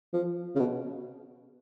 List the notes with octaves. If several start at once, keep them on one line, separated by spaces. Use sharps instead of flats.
F3
C#3
B2